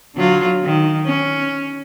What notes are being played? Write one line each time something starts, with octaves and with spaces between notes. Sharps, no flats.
D3 F#3 F4
D#3
C#4